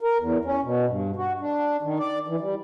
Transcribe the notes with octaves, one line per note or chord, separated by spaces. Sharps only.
A#4
E2
C#4
B2
G2
F#4
D4
D#3
D5
E3
G3